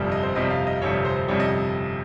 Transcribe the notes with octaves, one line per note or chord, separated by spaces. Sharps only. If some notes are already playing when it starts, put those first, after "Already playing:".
Already playing: G1 F2 C3 G3
D#5
C5
G1 F2 C3 G3 D#5
F5
D#5
G1 F2 C3 G3 C#5
C5
F2 C3 G3 C#5
D#5